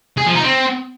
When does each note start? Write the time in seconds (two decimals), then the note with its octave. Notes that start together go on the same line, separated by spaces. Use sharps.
0.18 G#4
0.26 F3
0.35 D#4
0.44 C4